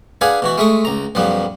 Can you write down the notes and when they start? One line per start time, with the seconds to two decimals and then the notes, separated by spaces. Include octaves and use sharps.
0.21 D4 G#4 B4 F5 F#5 G#5
0.42 B2 E3 F#4
0.58 G#3 A3 E5 C#6 D#6
0.85 C#2 A#5
1.15 B1 F#2 F3 G3 B3